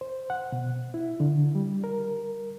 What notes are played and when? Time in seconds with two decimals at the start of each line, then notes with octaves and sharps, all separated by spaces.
0.01 C5
0.30 F#5
0.52 B2
0.94 E4
1.20 D3
1.55 G3
1.84 A#4